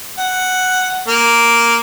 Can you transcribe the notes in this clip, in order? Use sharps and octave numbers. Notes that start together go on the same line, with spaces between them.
F#5
A#3